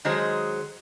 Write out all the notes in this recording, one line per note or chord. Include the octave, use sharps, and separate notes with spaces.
D#3 F#3 G#3 G#4 C5